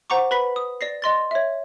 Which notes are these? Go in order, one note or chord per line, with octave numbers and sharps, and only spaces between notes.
C5 F#5 A#5 C#6 D6
B4 B5 B6
D#6
D5 A#6 C7
D#5 C6 A6
C#5 E5